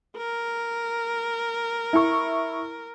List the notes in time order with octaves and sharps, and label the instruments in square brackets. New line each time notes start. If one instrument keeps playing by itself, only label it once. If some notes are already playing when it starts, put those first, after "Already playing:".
[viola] A#4
[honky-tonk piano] E4 C#6